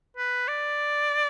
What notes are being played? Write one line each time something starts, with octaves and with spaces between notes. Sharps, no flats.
B4
D5